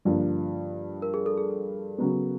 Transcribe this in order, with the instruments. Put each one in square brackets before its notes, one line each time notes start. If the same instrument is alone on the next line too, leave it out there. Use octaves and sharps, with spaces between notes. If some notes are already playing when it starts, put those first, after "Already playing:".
[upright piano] G2 D3 F3 A#3
[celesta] A#4
G#4
A4
G#4
A4
[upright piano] C#3 F#3 B3